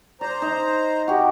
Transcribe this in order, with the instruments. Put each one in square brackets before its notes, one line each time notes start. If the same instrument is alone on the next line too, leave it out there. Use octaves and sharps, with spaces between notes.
[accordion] C5 A#5 [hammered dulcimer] D5
[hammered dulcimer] D#4
[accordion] C3 [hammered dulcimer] F#4 G4